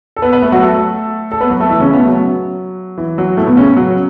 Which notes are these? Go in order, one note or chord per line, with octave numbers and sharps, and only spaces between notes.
A4
B3 B4
B3 B4
A3 A4
F#3 F#4
A3 A4
A4
B3 B4
F#3 F#4
A3 A4
E3 E4
C#3 C#4
B2 B3
A3
F#3
E3
F#3
A2 A3
B2 B3
C#3 C#4
F#3